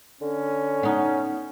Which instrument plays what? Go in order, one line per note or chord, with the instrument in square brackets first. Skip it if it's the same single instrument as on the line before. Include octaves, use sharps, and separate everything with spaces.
[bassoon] D3 [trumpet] C#4
[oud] B3 D#4